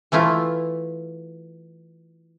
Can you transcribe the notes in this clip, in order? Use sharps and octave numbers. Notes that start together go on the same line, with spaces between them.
E3 A3 E4 F4